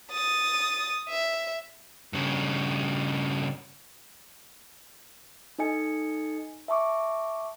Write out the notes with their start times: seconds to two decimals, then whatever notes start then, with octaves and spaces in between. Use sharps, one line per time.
0.12 D#6 A6
1.09 E5
2.13 G2 C#3
5.59 D#4 A4 D#5 G#5 C#7
6.68 E5 A5 C#6 D6